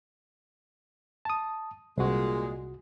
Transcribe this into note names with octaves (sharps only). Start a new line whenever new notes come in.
A5 D#6
C2 A#2 G#3 F#4